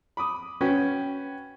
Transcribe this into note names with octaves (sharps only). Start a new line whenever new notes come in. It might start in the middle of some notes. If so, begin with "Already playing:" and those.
B5 D6 D#6
C#4 F#4 B4 G5